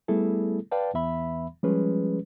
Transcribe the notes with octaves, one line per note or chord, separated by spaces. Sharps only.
G3 A3 B3 E4 G#4 A4
B4 D5 F5 G5 A5
E2 E3 B3 E5 B5
F3 G3 G#3 C#4 G#4 B4